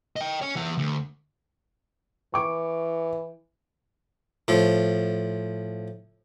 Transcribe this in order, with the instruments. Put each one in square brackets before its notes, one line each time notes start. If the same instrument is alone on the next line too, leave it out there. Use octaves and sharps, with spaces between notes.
[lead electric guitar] D#5 G5
C#5 G#5
E3 F#5
D2
[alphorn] E3 [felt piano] C#6 D6
[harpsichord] A2 F3